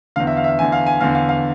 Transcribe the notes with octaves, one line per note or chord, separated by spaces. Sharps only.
E2 D3 F5
E5
F5
E5
F5
E2 D3 G#5
F5
G#5
E2 D3 F5
F5
F5